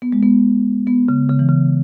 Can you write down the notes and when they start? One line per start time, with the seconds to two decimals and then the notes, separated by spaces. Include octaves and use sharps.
0.02 B3
0.12 G#3
0.23 B3
0.87 B3
1.09 C#3
1.29 C#3
1.39 E3
1.49 C#3